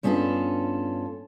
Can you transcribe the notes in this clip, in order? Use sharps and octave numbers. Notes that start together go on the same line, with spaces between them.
G2 B3 C#4 F4 F#4 A4